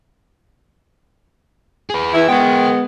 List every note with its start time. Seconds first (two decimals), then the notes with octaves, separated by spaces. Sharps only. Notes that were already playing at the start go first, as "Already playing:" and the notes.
1.90 G#4 B4
2.14 E3 E4
2.28 G#3 B3 A#4 G5